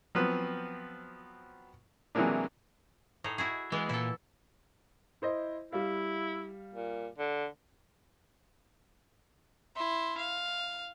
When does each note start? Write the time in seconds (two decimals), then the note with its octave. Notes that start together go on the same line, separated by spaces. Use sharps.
0.15 F3 F#3 B3 C4
2.15 C3 E3 F#3 G#3 A#3 D4
3.24 A2 D#4 G#4
3.38 E4 F#4 G#4
3.72 E3 G#3 B3
3.89 A#2 E4 A4
5.22 E4 C5 D#5
5.73 G3 E4 F5
6.74 A#2
7.18 D3
9.76 E4 C6
10.18 F5